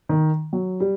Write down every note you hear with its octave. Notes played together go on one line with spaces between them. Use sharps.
D#3
F#3
G3